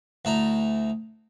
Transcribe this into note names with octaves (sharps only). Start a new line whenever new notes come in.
D2 E4 A#5